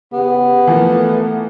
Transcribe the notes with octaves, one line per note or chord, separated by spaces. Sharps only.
E2 C#3 B3 G4
E3 F3 A3 A#3